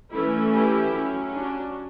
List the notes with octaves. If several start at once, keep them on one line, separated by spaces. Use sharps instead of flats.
E3 A3 C#4 E4
E4 G4
F#3 C#4
D4 F#4